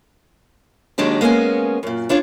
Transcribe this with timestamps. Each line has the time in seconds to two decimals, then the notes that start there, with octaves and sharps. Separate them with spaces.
0.98 D#2 D#3 F#3 G#3 D4 G4
1.21 G#3 A#3 B3 C#4 G#5
1.83 F#2 A#2
2.09 C#4 D4 F4 C#5